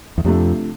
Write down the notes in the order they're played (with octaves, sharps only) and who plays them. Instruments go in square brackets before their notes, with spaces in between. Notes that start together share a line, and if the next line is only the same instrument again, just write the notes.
[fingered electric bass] E2
[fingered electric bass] F2 [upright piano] C3 F3 A3 D4